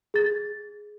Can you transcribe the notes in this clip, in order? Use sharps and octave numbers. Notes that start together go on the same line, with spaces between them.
G#4 A6